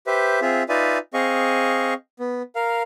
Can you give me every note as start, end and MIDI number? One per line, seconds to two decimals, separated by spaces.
0.07 0.40 67
0.07 0.40 71
0.07 0.40 72
0.07 0.40 76
0.42 0.63 60
0.42 0.63 65
0.42 0.63 68
0.42 0.63 76
0.69 0.98 63
0.69 0.98 65
0.69 0.98 71
0.69 0.98 74
0.69 0.98 76
0.69 0.98 80
1.14 1.94 60
1.14 1.94 68
1.14 1.94 75
1.14 1.94 77
1.14 1.94 85
2.20 2.42 59
2.56 2.83 70
2.56 2.83 77